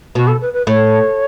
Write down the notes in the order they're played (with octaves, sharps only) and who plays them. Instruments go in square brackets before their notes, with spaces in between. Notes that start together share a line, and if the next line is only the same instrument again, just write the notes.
[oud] B2 [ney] F#4
[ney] A4
B4
B4
[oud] A2 [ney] C#5